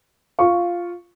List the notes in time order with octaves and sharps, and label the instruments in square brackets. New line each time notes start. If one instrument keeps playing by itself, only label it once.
[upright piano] F4 C#6